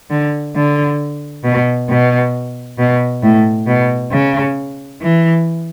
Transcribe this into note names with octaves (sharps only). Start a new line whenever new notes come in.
D3
D3
B2
B2
B2
A2
B2
C#3
E3